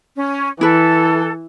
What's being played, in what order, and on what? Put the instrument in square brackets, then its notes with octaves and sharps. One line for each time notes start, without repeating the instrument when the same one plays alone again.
[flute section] C#4
[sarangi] E3 [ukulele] E4 B4 [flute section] A4